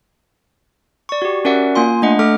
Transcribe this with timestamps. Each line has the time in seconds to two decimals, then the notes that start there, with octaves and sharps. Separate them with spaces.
1.09 D5 C#6
1.22 F#4 G4
1.45 C#4 F#4 A#4 D5 E5 F#5
1.75 A#3 F4 G#5 C6
2.02 A3 D4 D#5 F#5
2.19 A3 A4 D6 F6